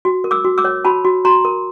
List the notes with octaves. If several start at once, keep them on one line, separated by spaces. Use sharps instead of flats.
F#4
A#4
D6 E6
F#4
D6 E6
C#5
F#4 A5 B5
F#4
F#4 A#5 C6
A#4